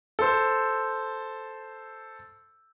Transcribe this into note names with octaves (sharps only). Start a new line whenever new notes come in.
A4 C5